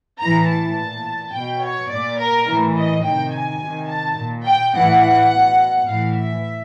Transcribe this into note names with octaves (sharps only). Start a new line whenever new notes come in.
A2 E3 A#5
A5
A#2
B2 G5
C#5
A#2 D5
A#4
A2 E3
D#5
C3 D#3 G5
G#5
C3 D#3
A5
A#2
G5
A2 E3 F#5
B2
A2 E3 F5
E5